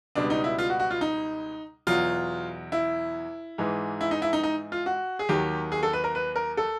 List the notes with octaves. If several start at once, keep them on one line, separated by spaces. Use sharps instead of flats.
C#2 B2 G3 D4
D#4
E4
F4
F#4
F#4
F4
D#4
E2 B2 F#3 F4
E4
G#2 E3 G#3
E4
D#4
E4
D#4
D#4
F4
F#4
G#4
D#2 D#3 F#3 G4
G#4
A4
B4
A#4
B4
A#4
A4